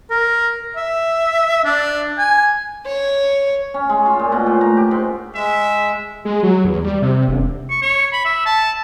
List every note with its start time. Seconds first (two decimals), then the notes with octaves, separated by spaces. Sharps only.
0.10 A#4
0.76 E5
1.64 D4
2.18 G#5
2.85 C#5
3.74 C#4
3.90 G#3
4.06 F4
4.19 A#2
4.32 B2
4.46 A2
4.61 A#5
4.77 G4
4.91 G#2
5.35 G#3 E5
6.25 G#3
6.43 F#3
6.65 E2
6.84 G3
7.02 C3
7.28 E1
7.70 C#6
7.82 C#5
8.12 B5
8.25 E5
8.46 A5